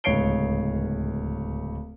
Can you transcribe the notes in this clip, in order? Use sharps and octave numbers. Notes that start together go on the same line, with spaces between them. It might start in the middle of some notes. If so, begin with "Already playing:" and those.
D1 C#2 C#5 C7 D7 G7